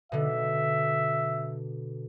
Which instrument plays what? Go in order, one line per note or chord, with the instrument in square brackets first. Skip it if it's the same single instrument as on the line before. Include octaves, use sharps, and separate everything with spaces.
[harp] B2 D3 [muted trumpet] E5